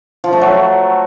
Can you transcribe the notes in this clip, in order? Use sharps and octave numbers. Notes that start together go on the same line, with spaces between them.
F3
A3
F#3